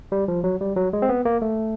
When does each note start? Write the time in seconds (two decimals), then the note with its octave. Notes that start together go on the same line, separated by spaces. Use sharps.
0.12 G3
0.28 F3
0.44 F#3
0.61 G3
0.76 F#3
0.93 G#3
1.02 C4
1.09 B3
1.25 A#3
1.42 A3